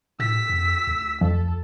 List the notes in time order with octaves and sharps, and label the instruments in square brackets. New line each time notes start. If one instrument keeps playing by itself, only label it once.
[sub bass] A2 [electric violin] E6 B6
[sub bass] F2
D2
[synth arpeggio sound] F2 [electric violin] A4